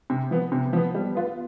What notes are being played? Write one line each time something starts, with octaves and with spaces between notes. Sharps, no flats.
C3
F3 B3
C3
F3 B3
G3
B3 F4 B4